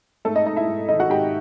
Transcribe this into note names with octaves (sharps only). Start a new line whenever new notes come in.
G#2 A3 A4
D#4 D#5
G#2 D#4 D#5
E4 E5
G#2
D#3 D#4 D#5
F#4 F#5
G#2 G4 G5